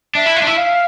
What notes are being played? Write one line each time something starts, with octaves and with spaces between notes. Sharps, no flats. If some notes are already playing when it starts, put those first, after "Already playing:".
D4 E5
E4
F4
D4
E4
F5